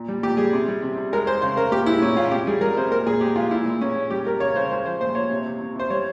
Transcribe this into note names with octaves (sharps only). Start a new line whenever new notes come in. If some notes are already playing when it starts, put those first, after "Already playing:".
Already playing: A#2
G3
A#2 G4
G3 G#4
C3
G3
C3
C3
G#3 A#4
G#3 C5
C#3 C5
C#3 A#4
A#2 G4
G#3 E4
A#2 C#4
A#2 F4
C3 G4
G3 G#4
G3 A#4
C3 C5
A#2 A#4
A#2 G#4
G#3 G4
G#3 F4
A#2 E4
A#2
A#2 C#4
A#2
G3 G4
G3 A#4
C#3 C#5
C#3 C5
G#3 C5
F3 C5
A#2 C5
A#2 C#5
C3
C3
C3
C3 C5
G3 C#5